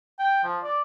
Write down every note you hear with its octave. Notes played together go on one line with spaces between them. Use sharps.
G5
F3
D5